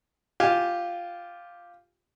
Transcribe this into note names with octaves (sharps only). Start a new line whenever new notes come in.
F4 G4 F5 G#5